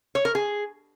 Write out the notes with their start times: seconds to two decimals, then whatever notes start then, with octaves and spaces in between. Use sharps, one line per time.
0.15 C#5
0.25 A#4
0.35 G#4